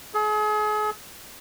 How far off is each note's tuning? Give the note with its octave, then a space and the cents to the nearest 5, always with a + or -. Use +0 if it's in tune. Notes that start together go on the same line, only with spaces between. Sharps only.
G#4 +40